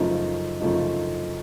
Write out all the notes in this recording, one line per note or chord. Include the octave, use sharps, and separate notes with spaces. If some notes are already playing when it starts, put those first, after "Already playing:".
Already playing: F#2 C#3 F3 A3 D#4
F#2 C#3 F3 A3 D#4